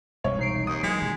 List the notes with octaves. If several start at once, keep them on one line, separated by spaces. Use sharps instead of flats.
E1 C2 G#2 C#5
D#4 C7 D7
D#2 D#6
E3 F#3 G#3 B6
D#1 C#3